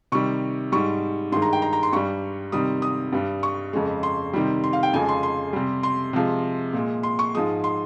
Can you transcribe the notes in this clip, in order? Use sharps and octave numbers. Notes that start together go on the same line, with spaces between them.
C3 D#3 G3 C#6
G#2 G3 C#6
G2 D#3 G#3 C6
A#5
G5
A#5
A#5
C6
G2 G3 C#6
C3 D#3 G3 D#6
D#6
G2 G3
C#6
F2 C#3 G#3
C6
C3 D#3 G3
C6
F5
G5
F2 C#3 F3 G#3 G#5
C6
C6
C3 G3
C6
C3 F3 G#3
A#2 G#3
C6
C#6
G#2 F3 G#3 D#6
C6